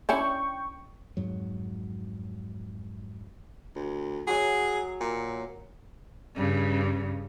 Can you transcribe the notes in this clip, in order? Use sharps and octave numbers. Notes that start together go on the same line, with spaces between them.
C#4 D4 E4 G5 C#6
F2 G#2 F#3
D2
F#3 G#4 A#5
A#2
G2 C#3